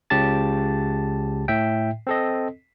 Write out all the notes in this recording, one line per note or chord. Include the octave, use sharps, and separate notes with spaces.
C#2 C#3 G4 A5 A6
A2 E5 G5
C4 A4 D#5